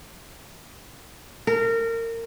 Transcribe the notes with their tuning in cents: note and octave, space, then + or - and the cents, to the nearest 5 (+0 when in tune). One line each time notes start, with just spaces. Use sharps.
A#4 -25